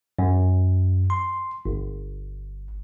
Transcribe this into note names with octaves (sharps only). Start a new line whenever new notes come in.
F#2
C6
G1